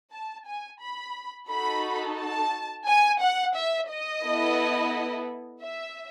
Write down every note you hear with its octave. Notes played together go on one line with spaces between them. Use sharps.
A5
G#5
B5
D#4 F#4 A4 B5
A5
G#5
F#5
E5
D#5
B3 E4 A4
E5